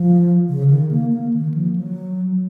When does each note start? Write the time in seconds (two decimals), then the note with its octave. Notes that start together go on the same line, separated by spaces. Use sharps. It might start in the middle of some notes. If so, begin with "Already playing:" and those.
Already playing: F3
0.49 C#3
0.70 D#3
0.91 A#3
1.12 A#3
1.34 D#3
1.54 F3
1.76 F#3